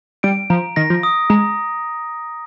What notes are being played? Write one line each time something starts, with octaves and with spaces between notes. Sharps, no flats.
G3 D7
F3 A#5
D#3 A#6
F3
D#6
G#3 A#5